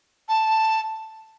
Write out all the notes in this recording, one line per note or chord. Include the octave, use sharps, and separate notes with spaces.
A5